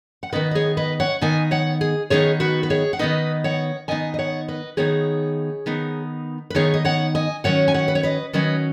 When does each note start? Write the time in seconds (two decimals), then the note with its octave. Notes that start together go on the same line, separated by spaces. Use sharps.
0.23 F#5
0.32 D#3 B3 D#4 B4 D#5
0.51 D#5
0.55 G#4 C#5
0.77 B4 D#5
1.00 C#5 F#5
1.21 D#3 B3 D#4 D#5 G#5
1.51 C#5 F#5
1.81 G#4
2.10 D#3 B3 D#4 G#4 C#5
2.40 F#4 B4
2.63 B4
2.70 G#4 C#5
2.93 F#5
2.99 D#3 B3 D#4 B4 D#5
3.44 C#5 F#5
3.88 D#3 B3 D#4 D#5 G#5
4.14 D#5
4.19 C#5 F#5
4.48 B4 D#5
4.77 D#3 B3 D#4 G#4 C#5
5.66 D#3 B3 D#4
6.50 B4
6.55 D#3 B3 D#4 G#4 C#5
6.74 D#5
6.85 C#5 F#5
7.15 D#5 G#5
7.44 D#3 F#3 C#4 C#5 F#5
7.68 G#5
7.74 C#5 F#5
7.88 B4
7.95 C#5
8.03 B4 D#5
8.33 D#3 F#3 C#4 B4 D#5